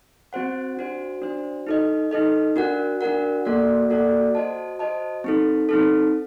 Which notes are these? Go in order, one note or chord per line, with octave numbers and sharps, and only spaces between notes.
C4 F#4 C5 F#5
D4 F#4 C5
D4 F#4 C5
D#4 A4 D#5
D#4 A4 D#5
D4 F#4 A#4 F#5
D4 F#4 A#4 F#5
A#3 F#4 A4 D5 F#5
A#3 F#4 A4 D5 F#5
F#4 C5 D#5 A5
F#4 C5 D#5 A5
C4 D#4 A4
C4 D#4 A4